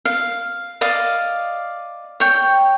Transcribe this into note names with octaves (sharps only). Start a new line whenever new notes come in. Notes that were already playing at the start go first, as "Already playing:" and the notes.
F5
D5 D#5 F5
C#5 G5